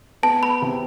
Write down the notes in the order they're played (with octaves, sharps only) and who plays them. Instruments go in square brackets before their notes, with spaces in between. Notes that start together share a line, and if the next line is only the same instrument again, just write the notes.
[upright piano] B3 [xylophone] A5
[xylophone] B5
[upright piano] C3